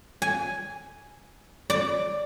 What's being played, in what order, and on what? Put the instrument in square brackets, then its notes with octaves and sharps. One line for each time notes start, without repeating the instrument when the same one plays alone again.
[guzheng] G#5
D5